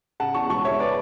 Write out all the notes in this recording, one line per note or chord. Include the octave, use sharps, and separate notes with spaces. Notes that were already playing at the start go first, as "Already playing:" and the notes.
C#3 F#5 A5
E2 A5 C#6
E1 A5 C#6
E2 C#5 E5
B4 D5